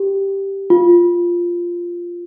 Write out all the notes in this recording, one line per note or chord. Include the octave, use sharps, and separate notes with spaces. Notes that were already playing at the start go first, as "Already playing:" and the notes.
Already playing: G4
F4